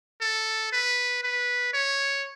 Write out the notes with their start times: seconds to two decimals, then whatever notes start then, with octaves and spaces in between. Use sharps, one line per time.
0.21 A4
0.72 B4
1.23 B4
1.73 C#5